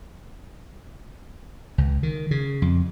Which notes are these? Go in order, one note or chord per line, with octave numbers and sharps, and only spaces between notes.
C#2
D#3
C#3
F2